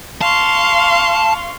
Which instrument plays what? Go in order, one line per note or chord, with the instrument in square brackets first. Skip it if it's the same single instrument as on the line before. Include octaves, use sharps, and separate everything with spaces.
[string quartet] F5 C6 C#6 [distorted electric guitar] A5